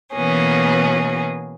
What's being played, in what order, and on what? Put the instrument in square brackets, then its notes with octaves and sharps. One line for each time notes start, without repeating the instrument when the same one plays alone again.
[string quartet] B2 E3 A#3 B3 C#4 G#4